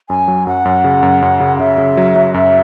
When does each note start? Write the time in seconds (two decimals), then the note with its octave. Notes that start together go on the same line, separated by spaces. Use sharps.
0.09 F#2 G#5
0.28 F#3
0.47 F#2 F#5
0.65 F#2
0.84 C#3
1.03 F#2
1.22 F#2
1.40 C#3
1.59 C#3 E5
1.78 C#3
1.97 F#3
2.15 F#3
2.34 F#2 E5